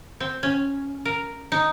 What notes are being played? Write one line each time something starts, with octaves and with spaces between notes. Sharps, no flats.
C4
C#4
A#4
D#4